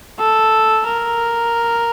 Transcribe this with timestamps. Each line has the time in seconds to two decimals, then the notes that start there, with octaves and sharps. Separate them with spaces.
0.19 A4
0.87 A#4